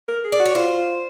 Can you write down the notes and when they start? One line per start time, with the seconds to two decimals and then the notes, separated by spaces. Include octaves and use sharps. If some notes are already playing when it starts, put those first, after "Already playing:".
0.08 A#4
0.24 G#4
0.32 D5
0.39 F#4
0.46 C#5
0.55 F4 C5